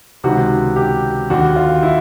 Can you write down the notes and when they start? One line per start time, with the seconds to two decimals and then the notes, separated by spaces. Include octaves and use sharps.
0.24 C#2 C3 D#3 F#4
0.76 G4
1.30 D#2 D3 F#4
1.56 F4
1.83 E4